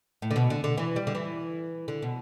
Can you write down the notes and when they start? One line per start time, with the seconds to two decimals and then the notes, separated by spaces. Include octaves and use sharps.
0.22 A2
0.31 D3
0.36 B2
0.50 D3
0.64 D3
0.77 E3
0.96 G3
1.07 D3
1.15 E3
1.88 D3
2.02 B2